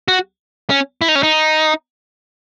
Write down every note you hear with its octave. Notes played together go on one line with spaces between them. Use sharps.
F#4
C#4
E4
D#4
C#4
D#4